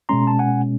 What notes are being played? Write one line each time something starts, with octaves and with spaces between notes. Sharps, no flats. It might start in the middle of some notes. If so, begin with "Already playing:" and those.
B2 G#3 C#4 A#5 C6
A5
F#5 G#5